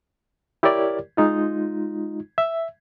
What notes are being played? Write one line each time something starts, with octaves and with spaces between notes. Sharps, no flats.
E4 G4 A#4 C#5 D5
G#3 D#4 F4
E5